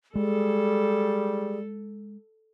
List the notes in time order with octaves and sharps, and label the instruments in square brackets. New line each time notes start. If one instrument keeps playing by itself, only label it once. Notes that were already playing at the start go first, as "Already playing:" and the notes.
[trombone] G3 [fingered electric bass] G#3 [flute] G#4 [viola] A4